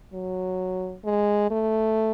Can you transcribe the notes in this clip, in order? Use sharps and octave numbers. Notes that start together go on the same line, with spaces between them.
F#3
G#3
A3